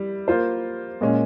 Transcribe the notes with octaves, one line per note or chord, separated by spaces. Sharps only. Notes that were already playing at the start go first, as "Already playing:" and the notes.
Already playing: G3 E4
A#3 F4 C5
A#2 G#3 C#4